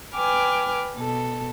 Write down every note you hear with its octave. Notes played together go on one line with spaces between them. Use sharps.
B4 G5 G#5 D6 F6
B2 A4